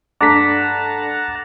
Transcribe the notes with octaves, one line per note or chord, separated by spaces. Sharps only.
G2 A3 D4 F#5 A5 A#5 D6 B6